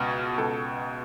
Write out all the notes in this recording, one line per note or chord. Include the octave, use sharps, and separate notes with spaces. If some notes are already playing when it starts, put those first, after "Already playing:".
Already playing: C#2 B2
C#2 B2 A4